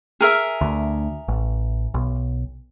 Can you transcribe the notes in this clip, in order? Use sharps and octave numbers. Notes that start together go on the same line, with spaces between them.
G#4 A#4 E5
D2
A1
B1